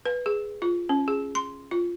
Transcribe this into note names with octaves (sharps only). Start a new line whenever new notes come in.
B4
G#4
F4
C#4
G#4
C6
F4